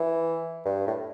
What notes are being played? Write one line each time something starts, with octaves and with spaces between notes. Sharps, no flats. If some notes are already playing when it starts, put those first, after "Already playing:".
Already playing: E3
G2
A2